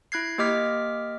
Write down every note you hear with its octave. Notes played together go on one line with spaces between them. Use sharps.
E4 F#6 G#6 C7
A#3 G4 D#5 D6 F6 B6